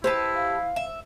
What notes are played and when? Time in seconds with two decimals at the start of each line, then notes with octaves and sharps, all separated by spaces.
0.04 E4 G4 B4 C5 A5
0.35 F5
0.76 E5